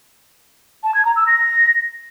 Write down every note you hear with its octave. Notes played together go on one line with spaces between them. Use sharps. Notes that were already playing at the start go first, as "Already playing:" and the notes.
A5
G#6
A#5
E6
A#6